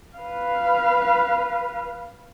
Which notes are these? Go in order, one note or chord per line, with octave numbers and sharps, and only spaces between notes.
B4 F5